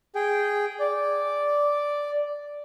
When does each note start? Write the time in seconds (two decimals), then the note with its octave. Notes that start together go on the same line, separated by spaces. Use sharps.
0.15 G#4 G5
0.79 D5